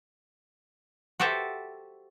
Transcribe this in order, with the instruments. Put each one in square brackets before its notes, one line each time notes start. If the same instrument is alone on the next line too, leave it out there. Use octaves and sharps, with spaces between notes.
[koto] F#4 G4 A4 C5 E5